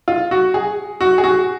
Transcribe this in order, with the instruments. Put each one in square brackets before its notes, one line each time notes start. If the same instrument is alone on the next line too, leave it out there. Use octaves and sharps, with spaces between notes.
[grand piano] F4
F#4
G#4
F#4
G#4
F#4